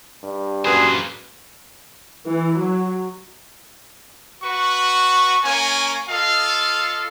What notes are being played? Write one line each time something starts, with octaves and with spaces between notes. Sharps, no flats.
G2
F#2 A#3 G#4 B4 C5
E3
F#3
F#4 B4 C#6
A#3 C#4 C#5 G#5
F4 A4 D#5 F5